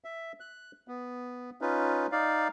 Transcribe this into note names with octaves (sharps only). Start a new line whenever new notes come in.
E5
F#6
B3
C#4 D#4 F4 B4
D#4 D5 F5